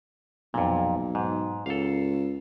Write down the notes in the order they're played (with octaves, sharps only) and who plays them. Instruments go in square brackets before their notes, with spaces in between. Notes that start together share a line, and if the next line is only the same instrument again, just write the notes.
[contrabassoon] B1 [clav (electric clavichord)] F2 A#2
[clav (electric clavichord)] G#2
[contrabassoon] C#2 [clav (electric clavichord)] A4 F5